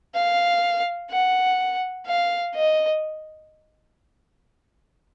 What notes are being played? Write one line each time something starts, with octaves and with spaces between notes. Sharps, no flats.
F5
F#5
F5
D#5